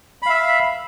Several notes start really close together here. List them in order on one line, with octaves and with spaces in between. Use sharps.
B5 F5 E5